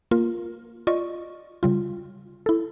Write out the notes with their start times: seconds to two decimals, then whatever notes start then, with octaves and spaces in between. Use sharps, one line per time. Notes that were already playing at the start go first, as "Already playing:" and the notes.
0.11 A#3 F4 A#4
0.87 F4 D5 D#5 C#6
1.63 C#3 G3 F4
2.46 E4 A4